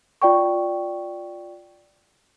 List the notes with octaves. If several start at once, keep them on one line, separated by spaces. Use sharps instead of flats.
F4 D5 G5 C#6